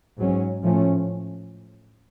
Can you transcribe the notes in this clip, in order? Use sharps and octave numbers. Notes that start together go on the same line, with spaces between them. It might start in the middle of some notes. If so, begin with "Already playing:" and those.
G#2 F#3 C#4
A2 F3 A3 C#4